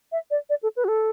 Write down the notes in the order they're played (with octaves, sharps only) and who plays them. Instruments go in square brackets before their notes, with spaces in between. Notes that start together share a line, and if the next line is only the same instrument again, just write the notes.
[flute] E5
D5
D5
A4
B4
F#4
A4